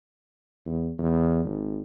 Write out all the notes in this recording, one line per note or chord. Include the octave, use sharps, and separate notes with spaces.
E2
E2
G#1